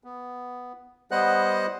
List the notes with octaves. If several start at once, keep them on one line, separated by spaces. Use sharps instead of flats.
B3
G3 B3 C5 D#5 F#5 F#6